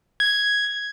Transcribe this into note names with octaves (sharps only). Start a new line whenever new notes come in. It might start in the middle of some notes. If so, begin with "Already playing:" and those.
G#6